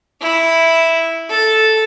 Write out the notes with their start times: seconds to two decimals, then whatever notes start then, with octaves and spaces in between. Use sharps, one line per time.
0.21 E4
1.30 A4